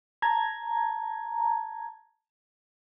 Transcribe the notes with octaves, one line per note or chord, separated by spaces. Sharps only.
A5 A#5 G#6